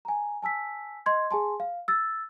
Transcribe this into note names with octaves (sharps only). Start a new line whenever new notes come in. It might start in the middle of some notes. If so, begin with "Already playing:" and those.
G#5 A#5
G#5 A5 E6 B6
D#5 C6 G#6
G#4 G#5 A5 C6
F5
E6 A6